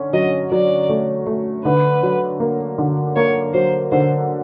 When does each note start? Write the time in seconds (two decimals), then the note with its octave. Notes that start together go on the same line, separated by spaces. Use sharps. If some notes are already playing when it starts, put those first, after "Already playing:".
Already playing: D3 C#4
0.13 F#3 D#5
0.51 F#3 D5
0.89 A3
1.27 A3
1.64 D3 B4
2.03 F#3
2.40 A#3
2.78 D3
3.16 A#3 C#5
3.54 F#3 C5
3.92 D3 C5